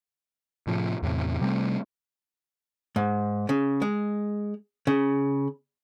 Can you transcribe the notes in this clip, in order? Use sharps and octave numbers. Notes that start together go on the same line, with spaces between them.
A2 C3 F3
E2 A2 C3
C3 G3 A3 C4
G#2
C#3
G#3
C#3